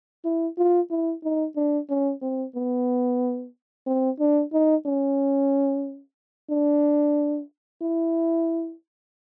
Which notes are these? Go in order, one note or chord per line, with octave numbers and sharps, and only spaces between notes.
E4
F4
E4
D#4
D4
C#4
C4
B3
C4
D4
D#4
C#4
D4
E4